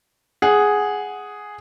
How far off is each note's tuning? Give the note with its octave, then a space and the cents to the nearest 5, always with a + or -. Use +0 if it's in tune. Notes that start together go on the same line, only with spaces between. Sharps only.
G#4 +0 F#5 +0